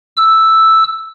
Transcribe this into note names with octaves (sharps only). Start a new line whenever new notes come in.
E6